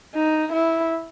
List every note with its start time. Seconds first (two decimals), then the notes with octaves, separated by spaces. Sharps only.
0.15 D#4
0.52 E4